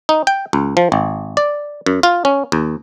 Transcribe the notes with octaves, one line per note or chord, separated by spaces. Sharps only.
D#4
G5
C#2
F3
G#1
D5
F#2
F4
C#4
D#2